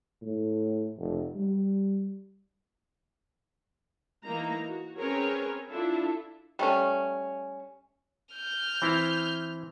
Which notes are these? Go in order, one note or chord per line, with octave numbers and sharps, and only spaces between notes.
A2
F1
G3
E3 A#3 D#4 A#5
F#4
C4 C#4 G#4 A#4 B4 C#5
D4 E4 F4 A4 E5
G3 A3 C#4
F6 G6
E3 C4 E4